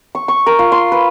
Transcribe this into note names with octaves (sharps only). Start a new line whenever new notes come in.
C#6
C#6
A#4
F4
C6
B4